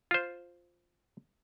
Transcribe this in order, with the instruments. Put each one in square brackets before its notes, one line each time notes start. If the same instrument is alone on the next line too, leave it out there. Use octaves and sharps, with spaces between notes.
[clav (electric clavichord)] F4 C5